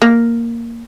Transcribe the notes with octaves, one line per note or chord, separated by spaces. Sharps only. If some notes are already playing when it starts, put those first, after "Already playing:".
A#3